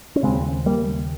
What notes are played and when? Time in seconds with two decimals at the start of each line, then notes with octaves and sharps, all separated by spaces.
0.16 C#4
0.23 D#2 C#3 G#3 C4
0.66 G3 A#3